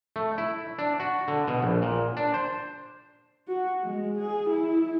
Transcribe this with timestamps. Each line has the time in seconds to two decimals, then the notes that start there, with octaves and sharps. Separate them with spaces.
0.16 A3
0.38 E4
0.79 D4
1.00 F#4
1.28 D3
1.47 B2
1.62 A#1
1.82 A#2
2.17 D4
2.34 C5
3.48 F#4
3.83 G#3
4.18 G#4
4.50 E4